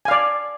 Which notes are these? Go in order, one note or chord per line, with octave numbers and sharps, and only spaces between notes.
D5 F5 G#5